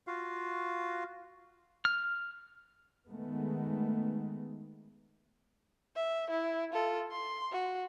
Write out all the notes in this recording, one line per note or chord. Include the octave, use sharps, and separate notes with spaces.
F4 F#4 F5
F6
D#3 G#3 A3 B3
E5
E4
F4 A4
C6
F#4